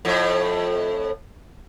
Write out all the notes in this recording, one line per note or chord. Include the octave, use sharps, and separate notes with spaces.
F2 A2